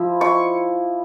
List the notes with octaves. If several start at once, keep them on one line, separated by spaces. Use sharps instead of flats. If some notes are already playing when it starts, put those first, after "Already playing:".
Already playing: F3 E4
C#6